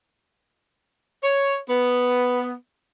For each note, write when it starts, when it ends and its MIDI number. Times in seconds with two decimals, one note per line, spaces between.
1.24 1.58 73
1.70 2.53 59